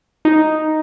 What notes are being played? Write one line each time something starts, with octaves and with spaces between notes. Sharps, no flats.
D#4